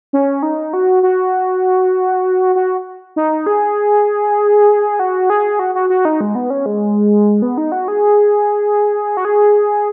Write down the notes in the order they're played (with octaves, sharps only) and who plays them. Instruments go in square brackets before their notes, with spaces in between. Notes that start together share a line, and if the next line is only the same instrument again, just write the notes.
[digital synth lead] C#4
D#4
F#4
F#4
F#4
D#4
G#4
F#4
G#4
F#4
F#4
F#4
D#4
G#3
B3
C#4
G#3
B3
D#4
F#4
G#4
F#4
G#4